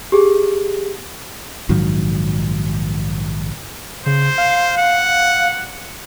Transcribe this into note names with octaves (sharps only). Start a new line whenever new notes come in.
G4 G#4
A#1 G#2 D#3 F#3
C#3 C5
F5
F#5